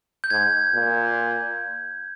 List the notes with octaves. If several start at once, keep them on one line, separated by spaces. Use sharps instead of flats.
G6
G#2 G#6
A#2